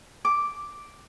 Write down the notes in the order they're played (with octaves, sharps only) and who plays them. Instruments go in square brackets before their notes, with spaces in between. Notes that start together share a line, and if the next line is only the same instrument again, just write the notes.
[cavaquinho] D6